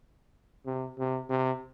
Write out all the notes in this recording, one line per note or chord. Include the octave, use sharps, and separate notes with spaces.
C3
C3
C3